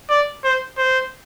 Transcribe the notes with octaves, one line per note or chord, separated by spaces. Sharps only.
D5
C5
C5